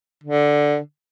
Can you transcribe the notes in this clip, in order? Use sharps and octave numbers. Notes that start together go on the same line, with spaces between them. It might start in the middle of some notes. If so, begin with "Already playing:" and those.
D3